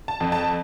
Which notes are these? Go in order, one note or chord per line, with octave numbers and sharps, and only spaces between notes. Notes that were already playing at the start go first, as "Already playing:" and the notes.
A5
F2
A5